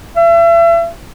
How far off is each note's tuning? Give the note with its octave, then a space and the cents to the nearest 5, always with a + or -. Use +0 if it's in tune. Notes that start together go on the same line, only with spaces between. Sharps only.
E5 +35